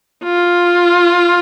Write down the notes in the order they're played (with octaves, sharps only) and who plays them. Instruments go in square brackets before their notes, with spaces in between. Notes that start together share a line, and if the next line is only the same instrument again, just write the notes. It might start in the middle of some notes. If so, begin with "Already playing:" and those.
[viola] F4